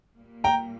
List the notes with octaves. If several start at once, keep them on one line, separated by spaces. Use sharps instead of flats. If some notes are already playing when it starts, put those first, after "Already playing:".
A#2 G3 A#3
G5 A#5